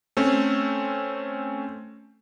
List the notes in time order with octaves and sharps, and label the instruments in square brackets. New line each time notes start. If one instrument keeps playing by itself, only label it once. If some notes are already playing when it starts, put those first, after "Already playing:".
[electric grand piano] A3 C4 C#4